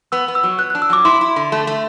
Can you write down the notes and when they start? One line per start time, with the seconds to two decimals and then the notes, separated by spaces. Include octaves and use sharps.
0.12 B3 E6
0.28 B3
0.35 E6
0.43 F#3
0.58 B3 F#6
0.70 D4 F#6
0.82 E6
0.90 F#3 D6
1.05 E4 C6
1.21 E4
1.36 D3
1.52 A3
1.67 A3